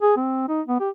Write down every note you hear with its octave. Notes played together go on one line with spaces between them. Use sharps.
G#4
C4
D#4
B3
G4